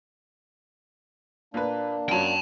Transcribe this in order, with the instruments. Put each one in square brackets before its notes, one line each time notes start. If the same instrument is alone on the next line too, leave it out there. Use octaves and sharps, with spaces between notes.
[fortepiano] A#2 B4 [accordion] A#3 D4
[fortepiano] F#2 F#3 [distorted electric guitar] G5 A5